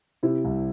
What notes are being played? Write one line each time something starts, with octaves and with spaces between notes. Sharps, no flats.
C3 E4
C2